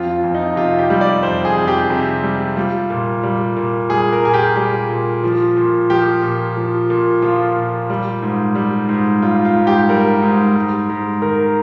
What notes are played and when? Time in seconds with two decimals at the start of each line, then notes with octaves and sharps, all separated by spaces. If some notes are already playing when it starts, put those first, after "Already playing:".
Already playing: F2 F4
0.24 F2
0.35 D#4
0.56 C3 F4
0.78 G4
0.90 G3
1.01 D5
1.23 F2 C5
1.45 G#4
1.57 F2
1.68 G4
1.90 C3
2.23 G3
2.56 G3 F4
2.90 A#2
3.23 G3
3.56 A#2
3.90 G3 G#4
4.12 A#4
4.23 A#2 G#4
4.34 G4
4.56 G3 G4
4.89 A#2
5.24 F3
5.57 A#2
5.90 F3 G4
6.22 A#2
6.57 F3
6.90 A#2
7.22 F3 F4
7.56 A#2
7.90 G3
8.22 G#2
8.55 G3
8.89 G#2
9.22 G3 F4
9.45 F4
9.56 G#2
9.67 G4
9.89 G3 A#4
10.22 G#2
10.55 G#2
10.89 G#2
11.22 D#3 A#4